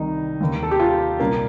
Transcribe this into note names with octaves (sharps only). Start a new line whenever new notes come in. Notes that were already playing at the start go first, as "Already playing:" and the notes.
Already playing: C2 C3 D#3 D#4
D#2 D#3
A4
G4
F4
C2 A#2 A#3